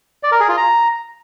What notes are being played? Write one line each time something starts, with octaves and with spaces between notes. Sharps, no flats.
D5
A#4
G#4
F4
A#5